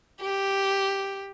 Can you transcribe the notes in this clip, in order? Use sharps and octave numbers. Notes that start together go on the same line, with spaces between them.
G4